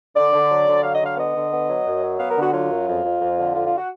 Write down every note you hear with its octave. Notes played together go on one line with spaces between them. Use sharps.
D3 D5
D3
F#3
D3
F#3 F5
D#5
D3
F5
B3 D#5
D3
B3
F#3
F#2
F#3
B3 F5
A#4
D3
F#4
F#3 F4
F#2
F2
F2
F2
D3
F2 F4
F4
F#4